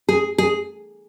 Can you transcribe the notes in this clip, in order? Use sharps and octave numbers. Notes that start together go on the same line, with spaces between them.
G#4
G#4